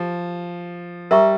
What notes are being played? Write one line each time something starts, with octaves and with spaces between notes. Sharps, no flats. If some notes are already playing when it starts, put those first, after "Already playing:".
Already playing: F3 G4
G3 A#4 E5 A#5 C#6